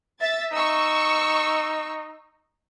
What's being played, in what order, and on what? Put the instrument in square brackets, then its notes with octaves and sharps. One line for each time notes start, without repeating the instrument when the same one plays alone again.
[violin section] E5 A6
[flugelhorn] D#4 [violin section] C#6 E6